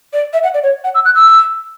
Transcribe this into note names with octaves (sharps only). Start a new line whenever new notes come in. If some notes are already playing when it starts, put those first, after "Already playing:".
D5
E5
F#5
D5
C#5
F#5
E6
F#6
E6